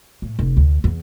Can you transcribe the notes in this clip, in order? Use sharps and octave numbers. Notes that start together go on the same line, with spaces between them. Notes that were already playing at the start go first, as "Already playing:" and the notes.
A2
F1
D2
E2